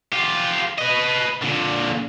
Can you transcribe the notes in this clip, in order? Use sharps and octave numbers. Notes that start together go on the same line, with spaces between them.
F4 G4
B4 D#5
A#2 D3